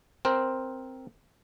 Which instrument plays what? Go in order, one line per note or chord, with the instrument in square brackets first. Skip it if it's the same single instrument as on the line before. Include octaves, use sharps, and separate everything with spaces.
[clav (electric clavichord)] C4 A#4 C5